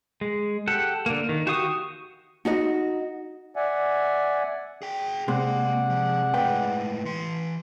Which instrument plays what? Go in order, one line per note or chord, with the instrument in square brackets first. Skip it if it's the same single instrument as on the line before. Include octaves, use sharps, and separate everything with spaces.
[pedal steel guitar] G#3
G4 A4 F#5
D3 A#3
D#3
F#4 G4 F5 C#6 D#6
[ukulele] D#4 F#4 D#5
[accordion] D5 E5 F#5 G#5
[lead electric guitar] G#4 G5
[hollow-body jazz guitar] C3 G#3 [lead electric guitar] A#3 [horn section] G#4 D5 F#5
[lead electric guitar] F3
[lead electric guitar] A2 G#3 [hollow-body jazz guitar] B4 G5
[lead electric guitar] E3 C6